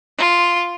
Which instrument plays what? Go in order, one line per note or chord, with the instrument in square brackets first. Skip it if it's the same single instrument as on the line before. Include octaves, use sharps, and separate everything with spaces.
[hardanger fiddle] F4